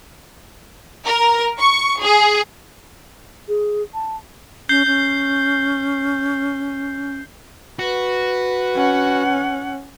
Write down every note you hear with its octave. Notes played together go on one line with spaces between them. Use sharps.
A#4
C#6
G#4
G#4
A5
C#4 G6 C7 G7
C#4 G6
F#4 B4
C#4 F#5